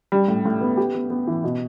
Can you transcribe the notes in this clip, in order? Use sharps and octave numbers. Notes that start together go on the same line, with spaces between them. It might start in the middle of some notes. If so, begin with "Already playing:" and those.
G3
A2
A2
B3
G4
B3
B3
E3
B2